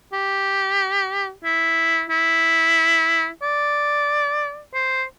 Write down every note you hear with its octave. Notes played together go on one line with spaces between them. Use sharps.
G4
E4
E4
D5
C5